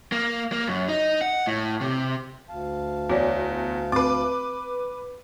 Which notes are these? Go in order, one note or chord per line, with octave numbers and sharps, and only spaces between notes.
A#3
A#3
F#2
D#4
F#5
A2
C3
D2 F5 A5
E2 F#4 C#5 D5
C4 B4 D6